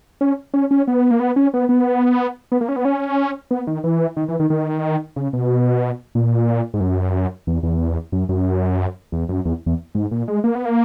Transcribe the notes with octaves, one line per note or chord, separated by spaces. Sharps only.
C#4
C#4
C#4
B3
A#3
B3
C#4
B3
B3
B3
A#3
C#4
B3
C#4
B3
D#3
E3
D#3
E3
D#3
D#3
C#3
B2
A#2
G#2
F#2
E2
E2
F#2
F#2
E2
F#2
E2
E2
G#2
A#2
G#3
A#3
B3
A#3